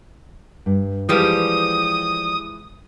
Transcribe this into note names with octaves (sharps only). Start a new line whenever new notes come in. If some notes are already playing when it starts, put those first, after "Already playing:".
G2
E3 F3 G3 G#3 E4 G4 B4 D#6